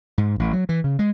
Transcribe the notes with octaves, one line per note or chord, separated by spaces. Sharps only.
G#2
A1
F#3
E3
C#3
G#3